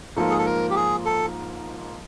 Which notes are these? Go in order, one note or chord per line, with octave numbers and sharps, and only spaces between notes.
G#2 F3 A#3 A4
G#4
A4
A#4
G4
G#4
A4